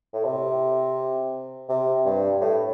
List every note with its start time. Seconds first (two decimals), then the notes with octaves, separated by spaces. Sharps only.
0.14 A2
0.25 C3
1.69 C3
2.05 G2
2.41 A2